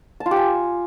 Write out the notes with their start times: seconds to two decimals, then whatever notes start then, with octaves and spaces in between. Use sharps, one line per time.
0.20 A5
0.26 F4
0.31 G4
0.37 G#5